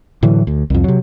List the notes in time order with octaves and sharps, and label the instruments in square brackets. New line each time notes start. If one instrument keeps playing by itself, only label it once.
[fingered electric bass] A2 D3 E3 F#3
D2
C2 F2
C3 F#3